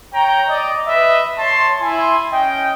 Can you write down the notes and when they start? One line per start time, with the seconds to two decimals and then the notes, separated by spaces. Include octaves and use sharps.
0.14 C#5 G5 A#5
0.49 D5 D#5
0.88 B4 D#5 E5
1.39 C#5 A5 C6
1.81 E4 G#5 C6
2.33 C#4 D#5 G5